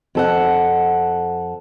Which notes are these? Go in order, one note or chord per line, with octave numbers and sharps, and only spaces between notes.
F2 A4 F#5